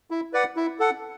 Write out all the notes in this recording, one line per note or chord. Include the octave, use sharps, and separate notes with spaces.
E4
B4 D5 F#5
E4
A4 F#5